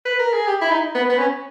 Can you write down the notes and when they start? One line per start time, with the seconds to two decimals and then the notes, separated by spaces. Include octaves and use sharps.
0.05 B4
0.19 A#4
0.33 G#4
0.47 G4
0.61 E4
0.71 D#4
0.95 B3
1.10 B3
1.18 C#4